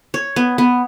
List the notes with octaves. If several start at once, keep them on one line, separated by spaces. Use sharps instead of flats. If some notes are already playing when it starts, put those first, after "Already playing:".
C#5
B3
B3